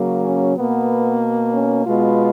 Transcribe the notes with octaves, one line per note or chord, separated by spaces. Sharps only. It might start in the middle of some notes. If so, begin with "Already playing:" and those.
Already playing: C#3 F#3 A#3
C#4
B2 A#3 B3
C#4
B2 G#3 B3 F4